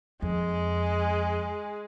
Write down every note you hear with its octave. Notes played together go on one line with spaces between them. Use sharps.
F2 G#3